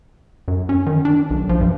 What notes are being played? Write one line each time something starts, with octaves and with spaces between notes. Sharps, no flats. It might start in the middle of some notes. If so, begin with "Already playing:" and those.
F#2
C#4
D#3
D4
B1
F3
G2